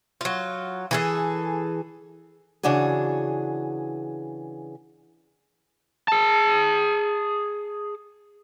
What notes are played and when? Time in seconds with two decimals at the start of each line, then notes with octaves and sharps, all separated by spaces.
0.21 F#3 F4
0.91 E3 G#4 A4
2.63 C#3 E3 D4 F#4 G#4
6.08 G#4 A5